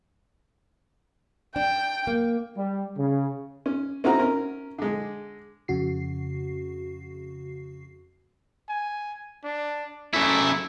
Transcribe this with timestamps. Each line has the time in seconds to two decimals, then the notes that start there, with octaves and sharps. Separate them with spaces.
1.56 D4 G5
2.07 A#3
2.56 G3
2.97 C#3
3.66 C#4
4.04 C4 C#4 D#4 E4 F#4 A#5
4.19 C#4 A#4
4.79 D3 G#3
5.68 F2 C#3 F#4 C7
8.69 G#5
9.44 D4
10.14 F#2 A3 E4